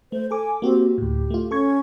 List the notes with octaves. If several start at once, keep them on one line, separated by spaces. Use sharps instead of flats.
A3 C5
A4 G#5 D6
A#3 C4 F#4 G4
D2 A2 G4
A3 F4
C#4 A4 C#6 G#6